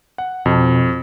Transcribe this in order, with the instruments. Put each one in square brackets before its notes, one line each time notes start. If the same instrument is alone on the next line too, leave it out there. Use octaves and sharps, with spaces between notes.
[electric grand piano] F#5
[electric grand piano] F2 [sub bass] B2